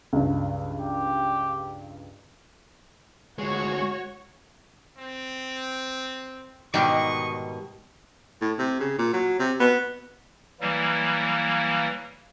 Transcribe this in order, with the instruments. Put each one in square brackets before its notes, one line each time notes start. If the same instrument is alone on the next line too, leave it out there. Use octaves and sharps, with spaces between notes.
[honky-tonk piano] C#2 G2
[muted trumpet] G4
[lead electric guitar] D2 G#3 [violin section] F#4 C#5
[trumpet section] C4
[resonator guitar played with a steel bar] G#2 B2 D#3 [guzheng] G3 G4 [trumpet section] D#5 C#6
[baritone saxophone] A2
C3
C#3
A#2
F#3
C3
B3
[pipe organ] E3 F#3 G3 A#3 E4